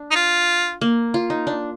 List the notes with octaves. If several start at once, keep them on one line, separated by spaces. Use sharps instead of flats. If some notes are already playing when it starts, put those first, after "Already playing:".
Already playing: D4
D#4
F4
A#3
F4
D#4
D4